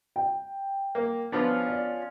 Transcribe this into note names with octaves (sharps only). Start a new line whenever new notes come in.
G5
A#3
F3 B3 C#4 D4 F4
D5